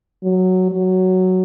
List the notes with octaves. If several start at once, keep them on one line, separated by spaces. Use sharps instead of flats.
F#3
F#3